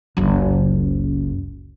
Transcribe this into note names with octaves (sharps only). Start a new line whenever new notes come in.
F#1 C#2